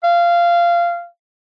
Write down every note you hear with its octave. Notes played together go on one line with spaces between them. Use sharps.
F5